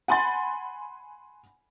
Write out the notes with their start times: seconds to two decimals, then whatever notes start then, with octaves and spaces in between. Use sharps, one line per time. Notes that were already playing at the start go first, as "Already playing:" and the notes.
0.08 F#5 G#5 B5 C6 A6